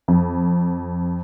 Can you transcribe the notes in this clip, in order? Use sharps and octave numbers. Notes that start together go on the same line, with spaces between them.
F2